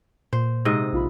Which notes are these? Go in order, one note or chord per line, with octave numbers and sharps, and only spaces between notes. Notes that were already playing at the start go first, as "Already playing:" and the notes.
A#2 C5
G#2 C3 D#5
A#1 F4 B5